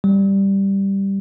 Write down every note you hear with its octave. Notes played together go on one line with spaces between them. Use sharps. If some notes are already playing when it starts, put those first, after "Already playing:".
G3